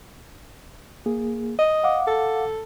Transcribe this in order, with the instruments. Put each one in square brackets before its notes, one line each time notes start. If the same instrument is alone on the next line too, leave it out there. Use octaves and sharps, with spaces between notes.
[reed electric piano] A#3 G#4
[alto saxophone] D#5
[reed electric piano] F5 F#5 D6
[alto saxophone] A4